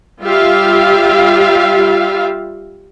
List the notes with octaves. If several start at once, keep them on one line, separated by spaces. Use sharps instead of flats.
G3 F4 G4 E5 F5